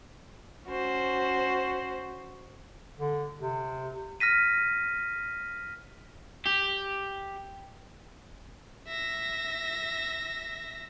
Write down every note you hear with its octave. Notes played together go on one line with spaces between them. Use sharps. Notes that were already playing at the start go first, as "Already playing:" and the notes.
C#4 F#4 C5
D3
C3
F6 A#6 B6 D#7
G4
E5 A#6